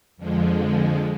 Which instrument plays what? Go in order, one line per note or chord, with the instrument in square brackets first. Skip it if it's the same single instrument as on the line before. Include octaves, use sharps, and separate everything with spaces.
[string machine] F2 D3 F3 G#3